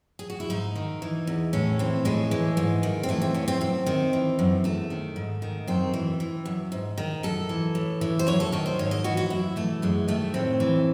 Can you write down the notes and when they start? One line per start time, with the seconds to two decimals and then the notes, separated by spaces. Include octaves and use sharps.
0.19 G#4
0.30 F#4
0.40 E4
0.50 G#2 D#4
0.76 D#3
1.02 E3
1.27 E2
1.53 A2 C#4
1.79 E3 C4
2.05 A2 G#3
2.31 E3
2.57 G#2
2.83 D#3
3.03 C4
3.09 E3 A3
3.22 C4
3.34 E2 C#4
3.48 C4
3.61 F#2 C4
3.86 D#3
4.13 E3
4.39 F#2
4.64 E2 A3
4.90 D#3
5.16 G#2
5.42 D#3
5.68 F#2 C4
5.94 E3
6.20 E3
6.46 F#2
6.72 G#2
6.98 D#3
7.23 F#2 A4
7.49 E3
7.75 A2
8.01 E3
8.19 C5
8.27 F#2 C#5
8.40 A4
8.52 D#3 A4
8.66 C5
8.79 G#2 C#5
8.91 D#5
9.04 E3 F#4
9.17 F#4
9.30 F#2 E4
9.56 E3 A3
9.82 F#2 G#3
10.08 D#3 A3
10.34 A2 C4
10.60 E3